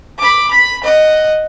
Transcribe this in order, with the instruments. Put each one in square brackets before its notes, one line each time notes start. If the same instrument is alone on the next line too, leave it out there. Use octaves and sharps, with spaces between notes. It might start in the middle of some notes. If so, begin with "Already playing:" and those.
[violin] B5 D6
B5 B6
D#5 F#5